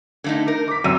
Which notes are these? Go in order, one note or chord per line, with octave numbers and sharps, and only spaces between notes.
D3 A3 D#4
A#4
D6 B6
F#2 C3 E6 D#7